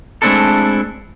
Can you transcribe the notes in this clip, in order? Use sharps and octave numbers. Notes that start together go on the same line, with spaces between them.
G#3 A3 C4 D4 E4 A4